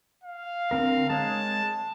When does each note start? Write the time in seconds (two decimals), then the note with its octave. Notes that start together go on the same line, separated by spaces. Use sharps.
0.24 F5
0.71 D3 C4 A#4
1.10 G#3 C#5 A5